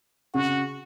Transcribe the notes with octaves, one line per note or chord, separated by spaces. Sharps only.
C#3 F#4